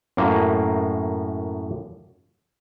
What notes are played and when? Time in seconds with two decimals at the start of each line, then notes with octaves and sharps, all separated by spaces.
0.17 F#2 A2 A#3